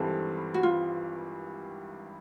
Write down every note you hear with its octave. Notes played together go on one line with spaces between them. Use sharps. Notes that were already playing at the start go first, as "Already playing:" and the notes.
Already playing: G#1 G2 E3 G3 C4 A4
F#4
F4